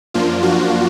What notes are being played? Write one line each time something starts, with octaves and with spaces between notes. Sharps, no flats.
F#2 F3 A#3 D4 F4
F#4